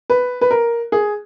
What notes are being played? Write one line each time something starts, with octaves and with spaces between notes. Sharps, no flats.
B4
B4
A#4
G#4